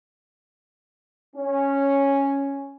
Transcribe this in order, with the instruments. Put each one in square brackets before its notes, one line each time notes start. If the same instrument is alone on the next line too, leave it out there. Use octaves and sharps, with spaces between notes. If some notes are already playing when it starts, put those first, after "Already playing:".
[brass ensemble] C#4